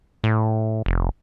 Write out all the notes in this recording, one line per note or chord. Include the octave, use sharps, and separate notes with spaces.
A2
F1